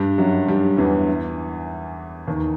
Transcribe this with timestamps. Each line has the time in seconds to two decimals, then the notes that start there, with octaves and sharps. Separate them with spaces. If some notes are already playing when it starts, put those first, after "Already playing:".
Already playing: G2 G3
0.18 F#2 F#3
0.47 G2 G3
0.77 E2 E3
2.27 D#2 D#3